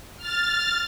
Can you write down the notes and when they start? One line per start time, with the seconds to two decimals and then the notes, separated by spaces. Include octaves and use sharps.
0.17 F6 A6